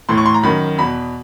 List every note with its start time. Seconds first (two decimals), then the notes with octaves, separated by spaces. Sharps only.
0.09 A2 E3 C6
0.17 C#6
0.26 C6
0.34 A#5
0.43 F#2 D#3 B5
0.78 E2 B2 B5